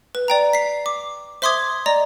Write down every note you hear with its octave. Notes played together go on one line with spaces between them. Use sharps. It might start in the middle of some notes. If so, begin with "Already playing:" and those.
B4
D5 G5 A#5
B6 C7
D6
C5 E5 C6 D6 D#6 G#6
D5 D#5 A#5